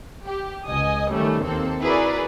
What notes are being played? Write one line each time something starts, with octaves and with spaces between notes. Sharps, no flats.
G4
C#2 D#5 G#5 D#6
D#3 G3 A3 C#4
D#2 A#3 C4 A4
E4 F#4 G#4 A#4 B4 D5